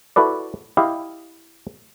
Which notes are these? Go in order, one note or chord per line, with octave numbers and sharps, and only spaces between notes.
E4 F#4 A4 B4 D5
E4 G4 D#5 F5